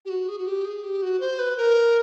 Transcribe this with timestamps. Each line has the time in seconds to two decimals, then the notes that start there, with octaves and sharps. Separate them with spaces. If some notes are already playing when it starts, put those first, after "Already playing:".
0.05 G4
0.09 F#4
0.28 G#4
0.38 F#4
0.47 G4
0.65 G#4
0.83 G4
1.02 F#4
1.20 C5
1.39 B4
1.57 A#4